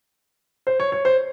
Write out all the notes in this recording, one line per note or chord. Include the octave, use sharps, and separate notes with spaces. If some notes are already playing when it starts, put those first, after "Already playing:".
C5
C#5
C#5
C5